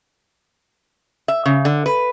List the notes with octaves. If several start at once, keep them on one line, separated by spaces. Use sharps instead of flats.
E5
C#3
D3
B4